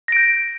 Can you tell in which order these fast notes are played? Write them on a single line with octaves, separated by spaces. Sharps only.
A#6 D7 G6